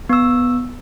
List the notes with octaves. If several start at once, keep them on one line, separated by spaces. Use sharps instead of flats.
B3 E6